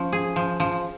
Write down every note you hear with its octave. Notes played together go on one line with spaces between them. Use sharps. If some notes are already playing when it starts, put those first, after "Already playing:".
Already playing: F3 C#4
G#4
F3
F3